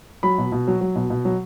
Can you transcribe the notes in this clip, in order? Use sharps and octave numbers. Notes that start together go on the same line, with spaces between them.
F#3 B5
B2
B2
F#3
F#3
B2
B2
F#3